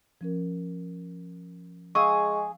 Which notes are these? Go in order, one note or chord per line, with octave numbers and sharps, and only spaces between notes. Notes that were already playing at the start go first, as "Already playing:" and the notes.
F3 C#4 A#4
G#3 G#4 F5 G5 C#6 E6